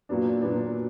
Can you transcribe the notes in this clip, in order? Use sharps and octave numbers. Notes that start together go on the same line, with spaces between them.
A#2 F#3 B3 D4
A#2 F#3 B3 D4